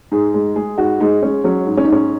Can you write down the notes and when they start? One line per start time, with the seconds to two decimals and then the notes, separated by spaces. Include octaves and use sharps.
0.12 G#2 G#4
0.34 G#3
0.56 G#3 G#4
0.78 G#2 F#4
1.00 G#3 D#4
1.22 G#3 C#4
1.44 F#3 C#4
1.67 G#2
1.77 C#4
1.84 D#4
1.88 G#2 C#4